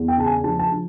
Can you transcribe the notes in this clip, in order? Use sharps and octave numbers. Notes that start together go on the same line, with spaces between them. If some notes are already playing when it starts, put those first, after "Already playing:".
Already playing: E2
G5
C#3 A5
G#5
F3 A5
A5
F3